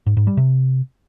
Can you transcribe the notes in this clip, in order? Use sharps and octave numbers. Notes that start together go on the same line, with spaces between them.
G#2
G#2
G3
C3